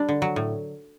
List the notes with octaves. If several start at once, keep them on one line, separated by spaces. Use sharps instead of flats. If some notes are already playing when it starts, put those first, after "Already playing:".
Already playing: G3 D4
D3
F#3
A2